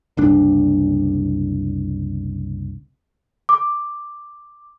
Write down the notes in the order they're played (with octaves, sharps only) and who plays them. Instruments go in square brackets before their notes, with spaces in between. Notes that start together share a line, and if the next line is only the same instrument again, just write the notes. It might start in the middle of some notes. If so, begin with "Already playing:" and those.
[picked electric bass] F#1 C2 D4
[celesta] D6